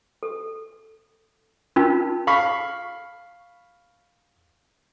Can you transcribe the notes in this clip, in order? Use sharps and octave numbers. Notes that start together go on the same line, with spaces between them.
A4
C#4 D#4 F4 A#4
F5 B5 C#6